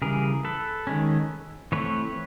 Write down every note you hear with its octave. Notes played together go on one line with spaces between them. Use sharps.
C#3 E3 G3 G#4 A#4
A4 B4
D#3 G#3 C#4
E3 A3 C4 B4 C#5